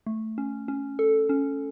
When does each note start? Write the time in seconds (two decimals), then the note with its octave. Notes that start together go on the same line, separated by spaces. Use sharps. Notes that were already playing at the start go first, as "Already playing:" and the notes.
0.07 A3
0.38 C#4
0.68 C#4
0.99 A4
1.29 C#4